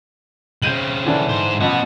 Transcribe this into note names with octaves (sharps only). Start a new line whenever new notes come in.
C#3 C4 G6 D#7 F#7
D3 E3 D4
G#2 C5
A1 F3 B3 F#4